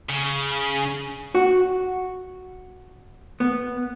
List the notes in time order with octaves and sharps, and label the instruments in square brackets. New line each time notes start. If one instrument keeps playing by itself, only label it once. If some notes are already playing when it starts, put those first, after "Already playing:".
[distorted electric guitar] C#3
[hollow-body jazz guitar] F#4
B3